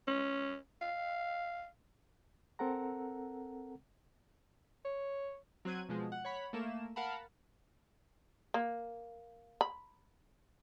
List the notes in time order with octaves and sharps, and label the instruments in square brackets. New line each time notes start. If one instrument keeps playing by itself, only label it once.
[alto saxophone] C#4
F5
[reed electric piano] C4 A4 A#4 F#5 A#5
[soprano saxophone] C#5
[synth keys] F#3 C4 F#6 G#6 D#7
B2 F3 G#3
F#5
C#5 F#5 B5
A3 A#3 E7
A#4 F5 F#5 A5 B5
[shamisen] A#3
B5